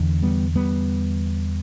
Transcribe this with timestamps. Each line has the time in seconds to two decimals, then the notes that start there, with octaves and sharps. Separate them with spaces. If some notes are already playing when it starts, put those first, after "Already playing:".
Already playing: E2 D3
0.22 G3 B3
0.55 G3 B3